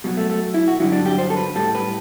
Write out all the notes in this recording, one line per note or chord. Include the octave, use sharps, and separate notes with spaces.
B2 F#3 G3
A3
A3
E4
F#4
G2 D3 F#3 E4
D4
G4
C5
A4
B4
A2 G3 A4
B4